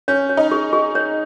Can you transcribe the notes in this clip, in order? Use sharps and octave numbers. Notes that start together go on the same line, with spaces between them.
C#4 C#5
C#5
D#4
G#4
G#4
C#5